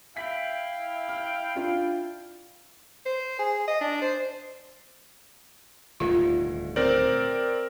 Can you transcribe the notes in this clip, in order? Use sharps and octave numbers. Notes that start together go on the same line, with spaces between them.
E4 F5 G5 B6
F6
D4 F4
C5
G#4
D#5
D4
C5
D#1 D2 G#2 F4
C4 A#4 C5 D5